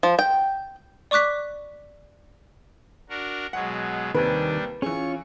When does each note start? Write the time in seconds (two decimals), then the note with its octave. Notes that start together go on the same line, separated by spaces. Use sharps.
0.03 F3
0.19 G5
1.11 D5 C#6 D6 F#6 B6
3.09 D4 F#4 A#4
3.53 B2 F#3 G#3 F#5
4.15 D#2 C3 D#3 G3 C4 D4 B4 G#5
4.82 E3 C#4 F4 G#4 C#6